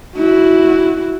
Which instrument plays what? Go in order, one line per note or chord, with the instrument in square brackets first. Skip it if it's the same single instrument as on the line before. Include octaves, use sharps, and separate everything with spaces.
[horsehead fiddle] E4 F#4